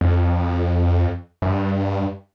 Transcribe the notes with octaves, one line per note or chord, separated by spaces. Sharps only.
F2
F#2
G2